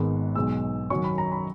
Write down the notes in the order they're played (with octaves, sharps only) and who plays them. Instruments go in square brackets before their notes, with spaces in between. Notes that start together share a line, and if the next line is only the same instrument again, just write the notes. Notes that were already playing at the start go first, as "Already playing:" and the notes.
Already playing: [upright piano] G#1 G#2 D#3 G#3 B3
B1 B2 G#3 E6
F#2 D#3 F#3 C#4 C#6
B5
A#5
B5